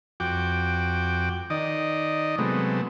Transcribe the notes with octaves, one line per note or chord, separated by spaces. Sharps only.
F2 F#4 G5 D6
D#3 D5 D#5
C3 F#3 G#3 A3 B3